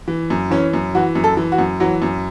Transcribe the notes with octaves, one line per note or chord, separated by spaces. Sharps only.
E3
F#2
E3 C#4
F#2
E3 F#4
F#2
A4
E3
F#4
F#2
E3 F#3
F#2